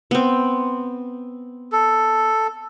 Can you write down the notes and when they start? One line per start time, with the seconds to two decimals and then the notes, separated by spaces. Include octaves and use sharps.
0.11 B3 C4
1.72 A4